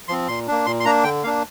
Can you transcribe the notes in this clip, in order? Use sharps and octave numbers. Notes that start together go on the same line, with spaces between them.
F3 C4 C6
A#2 C6
A#3 D4
A#2 C6
C6
A#3 D4 A#5
D3 G5
A#3 D4 F5